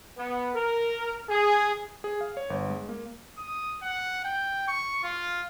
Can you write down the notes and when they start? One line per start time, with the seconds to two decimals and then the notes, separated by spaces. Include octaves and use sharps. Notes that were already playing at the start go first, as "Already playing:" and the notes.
0.17 B3
0.55 A#4
1.29 G#4
2.04 G#4
2.21 F5
2.37 C#5
2.50 G1
2.70 G#3
2.89 A#3
3.38 D#6
3.83 F#5
4.25 G5
4.68 C#6
5.04 F4